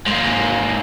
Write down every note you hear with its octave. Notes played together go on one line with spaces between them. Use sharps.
G#2 A#3